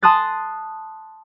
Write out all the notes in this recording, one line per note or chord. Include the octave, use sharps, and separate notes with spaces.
A5 C6 D#6 F#6 A6